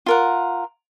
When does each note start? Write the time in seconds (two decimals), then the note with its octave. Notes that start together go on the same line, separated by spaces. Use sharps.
0.06 F4 A#4 F#5